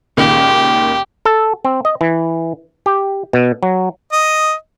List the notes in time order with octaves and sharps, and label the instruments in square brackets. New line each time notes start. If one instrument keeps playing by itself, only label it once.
[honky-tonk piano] C#2 A#2 D#3 [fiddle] G4
[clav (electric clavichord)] A4
C4
D#5
E3
G4
B2
F#3
[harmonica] D#5